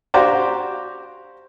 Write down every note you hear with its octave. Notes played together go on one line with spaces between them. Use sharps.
F#4 G4 C5 D5 F5 A#5